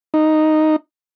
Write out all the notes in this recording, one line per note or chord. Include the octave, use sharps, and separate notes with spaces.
D#4